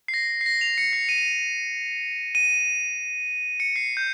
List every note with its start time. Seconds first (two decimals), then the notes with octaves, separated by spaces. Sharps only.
0.08 C7
0.14 A#6
0.41 C7
0.46 A#6
0.61 F7
0.78 C#7
0.93 C7
1.09 D#7
2.35 D#7
3.60 C#7
3.76 C7
3.97 G6